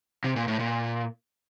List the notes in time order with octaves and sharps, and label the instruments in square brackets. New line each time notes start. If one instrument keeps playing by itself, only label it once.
[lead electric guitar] C3
A#2
A2
A#2